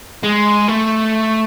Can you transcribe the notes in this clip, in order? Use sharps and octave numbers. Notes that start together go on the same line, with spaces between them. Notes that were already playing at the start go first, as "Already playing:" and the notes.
G#3
A3